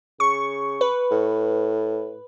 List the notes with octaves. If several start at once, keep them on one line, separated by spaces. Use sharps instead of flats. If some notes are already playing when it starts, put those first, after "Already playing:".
C#3 C#6
B4
A2